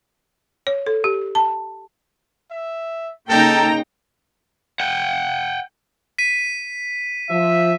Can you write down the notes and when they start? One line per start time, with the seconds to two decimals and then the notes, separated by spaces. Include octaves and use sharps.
0.67 C#5
0.86 A4
1.04 G4
1.35 A5
2.51 E5
3.30 C#3 A#3 D#4 A4 G5 A#5
4.80 F#5 G5
6.18 B6 D#7
7.30 F3 E5